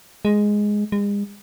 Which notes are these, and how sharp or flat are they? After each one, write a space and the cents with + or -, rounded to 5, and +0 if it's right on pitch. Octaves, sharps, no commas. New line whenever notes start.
G#3 +0
G#3 -40